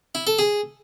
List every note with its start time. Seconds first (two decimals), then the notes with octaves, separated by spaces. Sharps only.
0.15 E4
0.27 A4
0.39 G#4